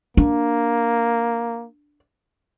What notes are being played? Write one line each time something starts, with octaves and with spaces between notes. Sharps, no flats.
A#3 D4